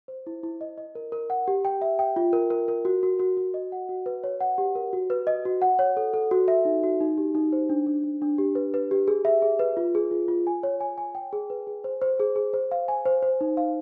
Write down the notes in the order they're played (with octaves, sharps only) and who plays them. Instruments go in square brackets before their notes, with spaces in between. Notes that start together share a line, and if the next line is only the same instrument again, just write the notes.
[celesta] C5
E4
E4
D#5
D#5
A#4
A#4
F#5
G4
G5
E5
G5
F4
A#4
A#4
A#4
F#4
F#4
F#4
F#4
D#5
F#5
F#4
B4
C#5
F#5
G4
A#4
F#4
B4
D#5
F#4
F#5
C#5
A4
A4
F#4
E5
D#4
F#4
D#4
G4
D#4
C5
D4
D4
D4
D4
G4
B4
B4
G4
G#4
E5
G#4
B4
F4
G#4
F4
F4
G#5
C#5
G#5
G#5
G5
G#4
B4
G#4
C5
C5
G#4
G#4
C5
F5
G#5
C5
C5
D#4
F5